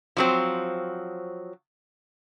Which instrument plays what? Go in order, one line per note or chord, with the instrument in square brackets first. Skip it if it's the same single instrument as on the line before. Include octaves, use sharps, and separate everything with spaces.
[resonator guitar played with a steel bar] F3 F#3 C4